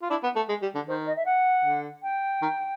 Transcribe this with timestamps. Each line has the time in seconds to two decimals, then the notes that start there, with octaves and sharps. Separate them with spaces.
0.02 F4
0.10 D4 E4
0.23 B3
0.36 A3
0.49 G#3
0.62 G3
0.75 D3
0.87 D#3 C5
1.06 D#5
1.16 E5
1.25 F#5
1.64 D3
2.03 G5
2.42 D#3